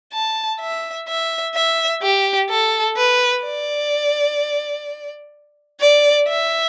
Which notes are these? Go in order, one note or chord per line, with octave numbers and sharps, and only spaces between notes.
A5
E5
E5
E5
G4
A4
B4
D5
D5
E5